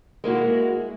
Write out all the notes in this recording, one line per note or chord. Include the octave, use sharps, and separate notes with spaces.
G#3 A#3 E4 F#4